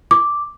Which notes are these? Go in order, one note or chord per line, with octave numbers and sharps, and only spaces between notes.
D6